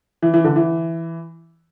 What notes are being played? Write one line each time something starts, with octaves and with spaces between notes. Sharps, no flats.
E3
E3
D3
E3